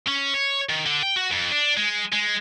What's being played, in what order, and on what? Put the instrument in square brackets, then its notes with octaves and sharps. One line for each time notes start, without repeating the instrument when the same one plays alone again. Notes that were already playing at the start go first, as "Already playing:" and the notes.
[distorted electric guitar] C#4
C#5
D#3
D3
G5
F#4
F2
D4
G#3
G#3